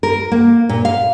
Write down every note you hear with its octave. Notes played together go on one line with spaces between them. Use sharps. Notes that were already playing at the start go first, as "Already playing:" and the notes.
A#4
A#3
A#2
F5